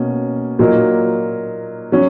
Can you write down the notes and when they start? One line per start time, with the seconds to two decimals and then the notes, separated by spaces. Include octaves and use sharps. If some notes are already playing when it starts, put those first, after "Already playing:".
Already playing: B2 A#3 C#4
0.59 A#2 F#3 A#3 D#4 A#4
1.92 F#3 C#4